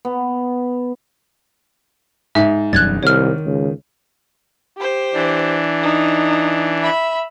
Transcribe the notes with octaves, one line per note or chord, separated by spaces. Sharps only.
B3
G#2 E5
E1 F#2 G3 F#6 G#6 A6
C2 D#3 C#5 F6
C#2
G4 C5
E3 D4
D#4
E5 B5